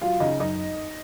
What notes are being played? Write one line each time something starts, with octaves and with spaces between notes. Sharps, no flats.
F#3 F4 F5
C#3 D#4 D#5
F#2 D#4 D#5